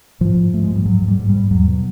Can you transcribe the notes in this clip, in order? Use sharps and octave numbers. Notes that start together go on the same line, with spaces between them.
G#2 F3
G#2
G#2 A3
G#3
G#2
G3
G#2 F#3
G#2
G3
G#2
G3
G#2
E2 F#3
B2